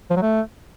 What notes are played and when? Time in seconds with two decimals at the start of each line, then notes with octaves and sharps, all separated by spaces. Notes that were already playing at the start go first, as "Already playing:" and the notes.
0.10 F3
0.16 F#3
0.22 A3